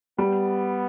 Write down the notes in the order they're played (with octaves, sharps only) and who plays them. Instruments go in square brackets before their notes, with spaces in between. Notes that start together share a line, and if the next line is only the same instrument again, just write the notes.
[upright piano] G3 [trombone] B3